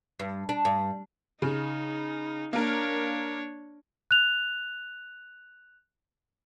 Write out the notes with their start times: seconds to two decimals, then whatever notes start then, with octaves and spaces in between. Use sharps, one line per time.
0.20 G2
0.49 D4
0.65 G2
1.42 C#3 D#4
2.53 A#3 D4 A#4 C#5
4.11 F#6 F7